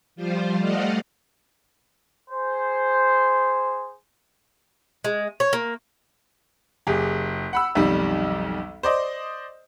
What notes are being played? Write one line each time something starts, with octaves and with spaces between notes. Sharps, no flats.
F3 G3 F4 C5
G3 A3 D5 D#5 F5 F#5
G#4 C5
G#3
C#5
A#3
F#1 G4 G#4
F#5 B5 E6
B1 F2 D#3 G3
C5 D5 D#5